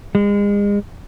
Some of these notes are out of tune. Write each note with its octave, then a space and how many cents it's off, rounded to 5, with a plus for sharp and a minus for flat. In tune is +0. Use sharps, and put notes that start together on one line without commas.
G#3 -35